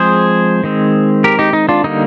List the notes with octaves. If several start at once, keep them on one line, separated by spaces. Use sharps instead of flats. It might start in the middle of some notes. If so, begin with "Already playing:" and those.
Already playing: F3 G#3 C4 G#4 C5
D#3 G#3 C4
G4 A#4
D#4 G4
D#4
D4 F4
D3 G3 A#3 D#4